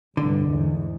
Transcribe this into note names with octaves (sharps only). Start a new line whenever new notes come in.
F1 C2 G2 D3
E2 G#2